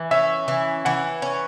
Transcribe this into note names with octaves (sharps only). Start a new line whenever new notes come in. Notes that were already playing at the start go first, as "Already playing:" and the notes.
Already playing: E3
C#4 E5
E3
E3 F#5
C#4